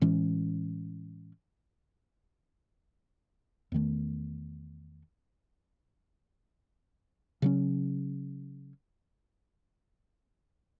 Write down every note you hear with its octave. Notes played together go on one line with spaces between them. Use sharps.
A2 E3 G#3 C#4
E2 D#3 A3
C#3 F#3 C#4